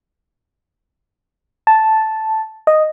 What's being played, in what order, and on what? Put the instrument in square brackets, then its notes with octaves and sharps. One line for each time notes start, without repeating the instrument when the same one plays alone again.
[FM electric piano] A5
D#5